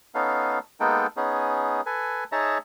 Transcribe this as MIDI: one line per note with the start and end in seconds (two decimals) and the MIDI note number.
0.15 0.59 59
0.15 0.59 61
0.15 0.59 63
0.15 0.59 69
0.15 0.59 77
0.80 1.07 56
0.80 1.07 58
0.80 1.07 59
0.80 1.07 63
0.80 1.07 69
0.80 1.07 79
1.17 1.81 59
1.17 1.81 61
1.17 1.81 63
1.17 1.81 68
1.86 2.24 69
1.86 2.24 71
1.86 2.24 80
2.32 2.58 63
2.32 2.58 68
2.32 2.58 73
2.32 2.58 76
2.32 2.58 81
2.32 2.58 82